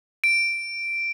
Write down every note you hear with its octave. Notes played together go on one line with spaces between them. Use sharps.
D7